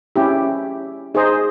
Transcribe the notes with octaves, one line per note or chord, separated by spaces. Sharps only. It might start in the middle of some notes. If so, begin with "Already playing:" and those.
C#4 E4 G4
D#4 G#4 C5 D#5